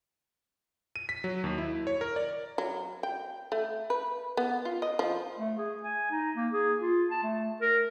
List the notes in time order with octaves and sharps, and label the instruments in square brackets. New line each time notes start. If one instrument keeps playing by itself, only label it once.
[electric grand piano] D#7
B6
F#3
D#2
E4
C#5
A#4
D5
[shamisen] F#3
G5
A3
B4
B3
F4
D#5
F3
[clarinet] A3
G#4
G#5
D#4
A#3
G#4
F4
A5
A3
A#4